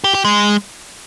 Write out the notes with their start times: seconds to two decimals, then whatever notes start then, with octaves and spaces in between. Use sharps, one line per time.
0.04 G4
0.14 G4
0.25 G#3